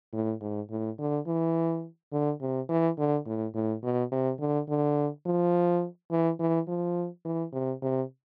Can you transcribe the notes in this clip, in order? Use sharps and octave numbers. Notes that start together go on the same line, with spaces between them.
A2
G#2
A2
D3
E3
D3
C3
E3
D3
A2
A2
B2
C3
D3
D3
F3
E3
E3
F3
E3
C3
C3